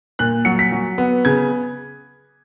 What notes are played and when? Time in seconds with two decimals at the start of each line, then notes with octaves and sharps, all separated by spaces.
0.19 A#2 F#6
0.45 F#3 C#7
0.59 B6
0.72 F#3
0.98 B3
1.25 C#3 G#6